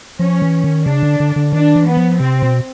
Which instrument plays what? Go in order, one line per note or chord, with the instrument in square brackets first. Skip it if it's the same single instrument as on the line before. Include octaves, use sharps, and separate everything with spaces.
[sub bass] F3 [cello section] C#4
[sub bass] E3
D#3
[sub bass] C#3 [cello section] D4
[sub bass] D3
D3
D3
[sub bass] D#3 [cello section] D4
[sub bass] E3
[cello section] B3
[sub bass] F3
[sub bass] C3 [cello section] C4
[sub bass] B2